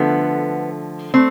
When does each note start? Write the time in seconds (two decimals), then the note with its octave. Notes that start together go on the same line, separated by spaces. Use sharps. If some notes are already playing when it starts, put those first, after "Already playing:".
Already playing: D3 F3 A3 B3
1.14 A3 C4